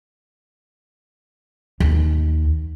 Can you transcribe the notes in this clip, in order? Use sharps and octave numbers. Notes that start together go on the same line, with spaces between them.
D#2